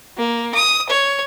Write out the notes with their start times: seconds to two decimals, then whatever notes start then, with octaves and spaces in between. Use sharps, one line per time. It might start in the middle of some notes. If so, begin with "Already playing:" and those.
0.18 A#3
0.54 D#6
0.89 C#5